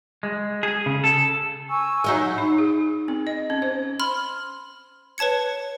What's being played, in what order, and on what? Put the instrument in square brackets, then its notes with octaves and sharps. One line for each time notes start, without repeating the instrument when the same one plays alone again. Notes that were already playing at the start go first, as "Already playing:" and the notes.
[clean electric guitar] G#3
G#4
C#3
A4
[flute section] G#5 C#6 E6
[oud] F#3 D#4 E5
[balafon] D#4
G#4
C4
D#5
C#4
C5
[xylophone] B5 C6 F6
B4 C#5 A5 G#6 C#7